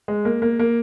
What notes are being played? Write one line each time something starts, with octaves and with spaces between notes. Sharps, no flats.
G#3
A#3
A#3
A#3